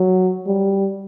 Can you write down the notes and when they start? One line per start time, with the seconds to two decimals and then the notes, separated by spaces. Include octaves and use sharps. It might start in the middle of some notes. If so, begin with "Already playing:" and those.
Already playing: F#3
0.47 G3